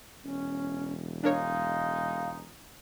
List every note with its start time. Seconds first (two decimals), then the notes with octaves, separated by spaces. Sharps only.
0.24 E1 C#4
1.23 G#3 D4 D#4 A#4 C#5 F5